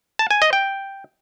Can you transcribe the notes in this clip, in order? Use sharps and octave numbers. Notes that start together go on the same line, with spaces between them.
A5
G#5
D#5
G5